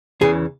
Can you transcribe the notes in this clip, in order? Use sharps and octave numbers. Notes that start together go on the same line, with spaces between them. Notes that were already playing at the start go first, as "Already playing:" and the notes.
E2 C#3 E3 G#4